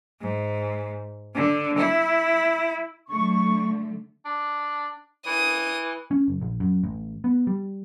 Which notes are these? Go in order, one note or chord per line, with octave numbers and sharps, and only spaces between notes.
G#2
D3
E4
D3 F#3 A3 C#6
D4
E3 D#6
C#4
F#1
A#1
F#2
A1
B3
G3